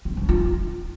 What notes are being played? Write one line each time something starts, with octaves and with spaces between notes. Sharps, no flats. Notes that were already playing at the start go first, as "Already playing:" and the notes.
C4
C#4
F4